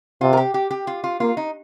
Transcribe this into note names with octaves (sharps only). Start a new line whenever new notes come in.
C3 F4
A#4
G4
G4
G4
F4
F4
A#3 F4
D#4